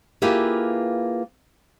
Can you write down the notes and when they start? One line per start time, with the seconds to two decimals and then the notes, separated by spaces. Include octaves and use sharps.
0.22 A#3 E4 F4 G4 G#4 B4